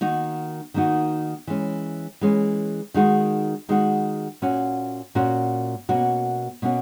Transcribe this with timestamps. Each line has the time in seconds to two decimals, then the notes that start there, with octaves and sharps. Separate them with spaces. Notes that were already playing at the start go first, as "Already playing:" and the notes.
0.01 D#3 A#3 D#4 F#4
0.74 D#3 A#3 D#4 F#4
1.47 E3 G#3 C#4
2.21 E3 G#3 C#4
2.94 D#3 G#3 D#4 F#4
3.69 D#3 G#3 D#4 F#4
4.42 A#2 A#3 C#4 F#4
5.15 A#2 A#3 C#4 F#4
5.89 B2 A#3 C#4 F#4
6.62 B2 A#3 C#4 F#4